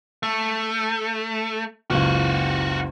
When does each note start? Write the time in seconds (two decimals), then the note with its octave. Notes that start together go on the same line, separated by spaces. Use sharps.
0.23 A3
1.90 F#1 C#2 F4 F#4